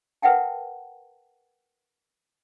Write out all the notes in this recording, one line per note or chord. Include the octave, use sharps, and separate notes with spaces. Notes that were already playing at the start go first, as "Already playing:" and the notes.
A#4 B4 E5 F#5 G5 A5